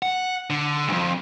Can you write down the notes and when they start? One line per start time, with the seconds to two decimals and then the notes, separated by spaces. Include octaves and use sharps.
0.03 F#5
0.50 D3
0.88 C2 F2